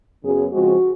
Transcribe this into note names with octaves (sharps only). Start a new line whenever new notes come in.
F#2 C#3 F#3 B3 G#4
C#3 F3 G#3 C4 F#4